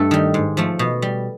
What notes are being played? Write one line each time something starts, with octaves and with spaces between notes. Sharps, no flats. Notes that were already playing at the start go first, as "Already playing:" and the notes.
Already playing: G2 A3 A4
D#3 G3
G#2
F3 A3
B2
G3